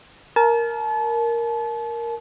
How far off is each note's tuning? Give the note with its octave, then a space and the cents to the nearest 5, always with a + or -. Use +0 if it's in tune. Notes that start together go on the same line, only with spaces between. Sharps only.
A#4 +0 A5 -35